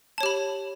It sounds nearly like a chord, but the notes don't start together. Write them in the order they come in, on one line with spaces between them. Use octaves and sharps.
A5 C#5 G4 B5